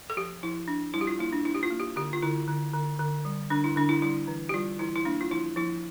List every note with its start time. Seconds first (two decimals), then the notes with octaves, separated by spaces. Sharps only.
0.10 A4
0.16 F3 G4
0.43 F3 E4
0.68 D4
0.94 G3 E4
1.01 G4
1.07 F4
1.19 A#3 E4
1.32 D4
1.45 D4 E4
1.55 G4
1.63 F4
1.70 A#3
1.80 G4
1.96 D3 G4
2.13 F4
2.22 D3 E4
2.48 D3
2.73 D3
2.99 D3
3.25 G3
3.50 D3 D4
3.64 E4
3.76 D3 D4
3.89 E4
4.02 G3 E4
4.27 E3
4.49 G4
4.54 G3 F4
4.79 E3 E4
4.96 E4
5.05 A#3 D4
5.21 F4
5.30 F3 E4
5.56 F3 E4